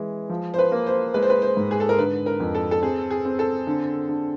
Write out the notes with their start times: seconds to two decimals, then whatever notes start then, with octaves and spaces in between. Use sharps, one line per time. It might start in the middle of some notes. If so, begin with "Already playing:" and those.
Already playing: E3 G#3
0.29 F3
0.54 C5
0.58 B4
0.72 A#3
0.87 C5
1.14 G#3 B4
1.22 C5
1.30 B4
1.42 C5
1.57 G#2
1.71 G#4
1.80 A4
1.89 A#4
1.98 D3 B4
2.26 A#4
2.40 F2
2.55 A4
2.71 A4
2.82 C4 G#4
3.11 G#4
3.25 C4
3.39 A4
3.67 D3
4.09 D3